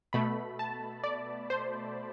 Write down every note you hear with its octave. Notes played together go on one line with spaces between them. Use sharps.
B2 A3 B5
A5
D5
C5